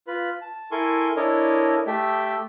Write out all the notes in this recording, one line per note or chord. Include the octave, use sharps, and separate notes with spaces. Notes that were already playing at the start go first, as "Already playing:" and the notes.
F4 B4 B5
A5
E4 A4 A#4 G#5 C6 C#6
D4 E4 A4 A#4 C#5 D#5
A3 G4 A4 E5 G5